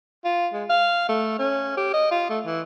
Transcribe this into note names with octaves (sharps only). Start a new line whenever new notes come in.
F4
G#3
F5
A3
C#4
G4
D#5
F4
A3
E3